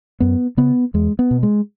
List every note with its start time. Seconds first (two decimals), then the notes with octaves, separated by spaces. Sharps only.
0.20 F#2 B3
0.57 C#3 B3
0.94 E2 G#3
1.19 B3
1.31 B2
1.43 G#3